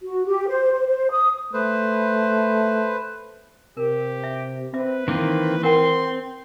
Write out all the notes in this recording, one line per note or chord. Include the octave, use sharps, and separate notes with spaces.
F#4
G4
C5
C5
C5
D#6
A3 B4 C5
C3 G4 A#4
E5
C4 B4 E5 D6
D#3 E3 A#3 C4
C4 A#4 F#5 G5 C6